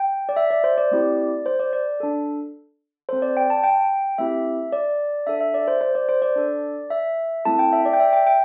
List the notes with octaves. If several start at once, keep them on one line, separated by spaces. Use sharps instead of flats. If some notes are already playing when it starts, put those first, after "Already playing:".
Already playing: G5
D5
E5
D5
C5
D5
A3 C4 E4 G4
C5
D5
D5
D4 A4
C4 A4 C5
D5
G5
A5
G5
A3 C4 E4 G4 E5
D5
D4 A4 E5
E5
D5
C5
C5
D5
C5
D5
D4 A4
E5
A3 C4 E4 A4 A5
G5
E5
D5
G5
E5
G5
G5